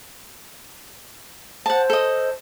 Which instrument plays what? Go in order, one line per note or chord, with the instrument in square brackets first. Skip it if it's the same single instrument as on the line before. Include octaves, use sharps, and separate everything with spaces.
[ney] C5 [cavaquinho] F#5 A5
[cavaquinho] A4 D#5